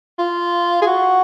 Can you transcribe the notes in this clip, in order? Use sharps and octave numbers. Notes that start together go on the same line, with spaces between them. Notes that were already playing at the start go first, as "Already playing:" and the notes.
F4
G#4
F#4